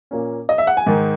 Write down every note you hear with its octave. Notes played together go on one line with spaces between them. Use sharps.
A#2 A#3 C#4
D#5
E5
F#5
G#5
G#2 D#3 G#3